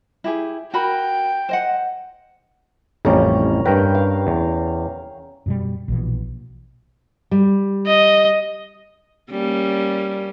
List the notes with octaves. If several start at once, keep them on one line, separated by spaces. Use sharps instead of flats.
E4 G4 G#4
F#4 A#4 G5 B5
C5 D#5 F#5
A1 F2 G3 C#4 A#4
G2 A#4 B4 G5
F5
E2
F#2 B2 G3
A#1 B2 E3
G3
D#5
G3 A#3 C#4